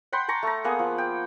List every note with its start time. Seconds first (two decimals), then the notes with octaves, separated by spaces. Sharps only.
0.12 F#5 G5 B5 C6
0.28 A5 A#5 C#6
0.43 A3 A#5
0.64 A#3 B3 G#4
0.79 F3
0.98 G5